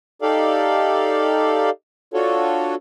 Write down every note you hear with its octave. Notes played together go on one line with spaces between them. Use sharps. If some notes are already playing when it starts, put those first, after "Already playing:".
D#4 G4 A4 D5 F5
D4 F4 F#4 A4 C#5